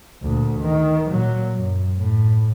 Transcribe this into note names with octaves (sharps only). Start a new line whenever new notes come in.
D2 A#2
D#3
A#2 F#3
F#2
A2